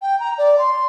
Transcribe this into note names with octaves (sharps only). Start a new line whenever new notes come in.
G5
A#5
D5
C6